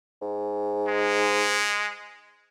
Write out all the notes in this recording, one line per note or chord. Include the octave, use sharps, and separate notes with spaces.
G#2
G#3